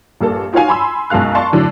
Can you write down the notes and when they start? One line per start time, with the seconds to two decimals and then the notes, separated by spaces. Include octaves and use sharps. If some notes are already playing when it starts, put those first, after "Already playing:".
0.21 A#1 G2 A#3 A4
0.53 D#4 F4 F#4 C#5 F5 G#5
0.68 G#5 B5 C6 E6
1.10 B1 F#2 G#3 F5 F#6
1.35 D5 F5 A5 C6 C#6
1.52 A2 D3 F#3